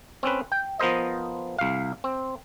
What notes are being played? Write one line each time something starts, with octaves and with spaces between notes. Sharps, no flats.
C4 C#4 B4
G5
F3 B3 A#4 C5 D#5
C2 F5
C4